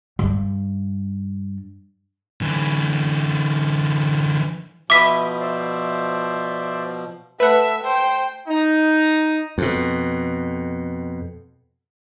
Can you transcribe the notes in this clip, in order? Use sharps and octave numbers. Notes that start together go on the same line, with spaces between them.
G2 G3
D3 E3
B2 F3 E4 B4 D#5 D6 B6
C5 D5 E5
A3 B4 E5 F#5
C5 G5
D#4
F2 B2